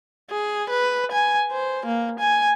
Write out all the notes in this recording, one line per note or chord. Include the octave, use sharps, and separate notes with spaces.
G#4
B4
G#5
C5
A#3
G#5